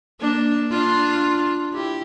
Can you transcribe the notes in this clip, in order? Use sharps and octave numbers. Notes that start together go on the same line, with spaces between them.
A#3 D4
D4 F4
E4 G4